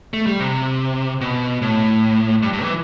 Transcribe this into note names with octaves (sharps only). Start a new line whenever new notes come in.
A3
G3
C3
B2
A2
G2
G2
E3